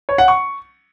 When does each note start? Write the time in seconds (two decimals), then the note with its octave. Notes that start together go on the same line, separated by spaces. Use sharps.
0.09 C#5
0.18 F#5
0.28 C#6